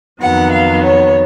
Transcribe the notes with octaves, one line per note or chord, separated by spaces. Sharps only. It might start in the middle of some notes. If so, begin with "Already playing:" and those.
F2 D#3 F#3 B3 F#5
F5
C#5